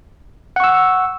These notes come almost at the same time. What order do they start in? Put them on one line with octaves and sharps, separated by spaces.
F#5 C#6 E6